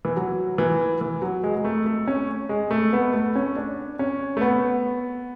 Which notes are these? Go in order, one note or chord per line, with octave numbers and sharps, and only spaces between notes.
E3
F#3
E3
E3
F#3
G#3
G#3
A3
A3
C#4
G#3
A3
B3
A3
C#4
D4
C#4
A3
B3